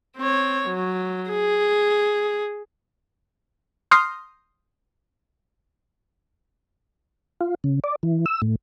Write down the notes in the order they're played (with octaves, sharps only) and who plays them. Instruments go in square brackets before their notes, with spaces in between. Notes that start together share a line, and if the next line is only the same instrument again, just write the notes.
[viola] C4 C#5
F#3
G#4
[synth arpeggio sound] C6 D#6 F6 G6 A#6 C7
[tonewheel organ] F4
C#3
D5
E3
E6
A2